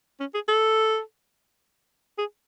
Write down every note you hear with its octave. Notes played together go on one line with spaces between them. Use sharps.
C#4
G#4
A4
G#4